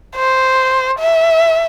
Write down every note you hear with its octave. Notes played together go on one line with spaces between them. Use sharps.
C5
E5